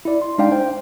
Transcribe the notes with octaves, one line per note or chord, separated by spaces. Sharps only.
E4 D5
C6
G#3 D4 D#4 D5 F5 G5
C5 G5